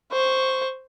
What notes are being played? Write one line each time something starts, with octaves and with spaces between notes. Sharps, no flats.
C5 C#6